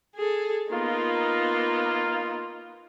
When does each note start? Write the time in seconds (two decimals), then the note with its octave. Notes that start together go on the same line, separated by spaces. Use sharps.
0.15 G#4 A4
0.71 A#3 B3 D#4 F4